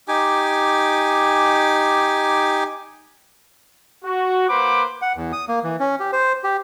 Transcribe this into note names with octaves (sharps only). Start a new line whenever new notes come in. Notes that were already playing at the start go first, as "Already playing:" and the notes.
D#4 G4 G#5 D6
F#4
A#3 B4 C5 F#5 B5 D6
F#5
E2
D#6
A#3
E3
C#4
G4
C5
G4